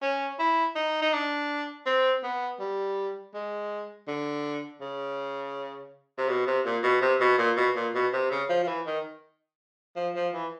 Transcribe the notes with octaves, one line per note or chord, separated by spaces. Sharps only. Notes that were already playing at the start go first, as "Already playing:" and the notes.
C#4
E4
D#4
D#4
D4
C4
B3
G3
G#3
D3
C#3
C3
B2
C3
A#2
B2
C3
B2
A#2
B2
A#2
B2
C3
C#3
F3
F3
E3
D#3
F3
F3
E3